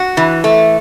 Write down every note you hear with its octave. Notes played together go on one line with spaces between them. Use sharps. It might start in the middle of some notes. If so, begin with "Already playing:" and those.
Already playing: F#4
E3
A3